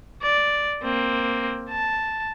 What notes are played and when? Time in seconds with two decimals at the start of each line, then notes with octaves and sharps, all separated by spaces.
0.22 D5
0.83 A#3 C4
1.70 A5